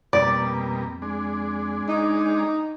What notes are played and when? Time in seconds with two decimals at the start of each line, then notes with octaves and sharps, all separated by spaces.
0.13 F2 B2 G3 A#3 D5
1.02 G#3 D4
1.89 D#4